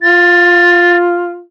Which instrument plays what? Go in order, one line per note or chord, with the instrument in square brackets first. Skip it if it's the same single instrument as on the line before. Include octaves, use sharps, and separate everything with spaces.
[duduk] F4 [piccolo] A6